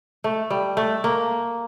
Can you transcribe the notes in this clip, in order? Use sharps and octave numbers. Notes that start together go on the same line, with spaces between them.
A3
G3
A3
A#3